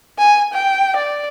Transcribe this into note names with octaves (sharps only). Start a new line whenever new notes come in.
G#5
G5
D5